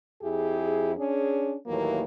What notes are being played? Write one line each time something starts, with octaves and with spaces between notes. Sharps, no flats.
F2 E4 G4 G#4
C#4 D4 G#4
D#2 A2 E3 F#3 A#3